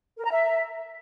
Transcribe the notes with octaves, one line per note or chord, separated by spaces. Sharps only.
A#4
A#5
E5